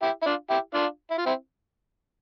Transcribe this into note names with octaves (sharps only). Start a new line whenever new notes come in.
E4 G4
E4
D4 F4
E4 G4
D4 F4
E4
F4
C4 E4